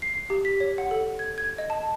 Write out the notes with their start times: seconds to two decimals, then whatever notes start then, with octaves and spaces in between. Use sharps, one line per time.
0.02 C7
0.30 G4
0.45 B6
0.60 C#5
0.78 F#5
0.91 A4
1.19 G#6
1.38 G#6
1.58 D#5
1.70 A5